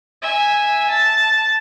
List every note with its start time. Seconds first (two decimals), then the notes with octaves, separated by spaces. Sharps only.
0.22 E5 G#5
0.90 A5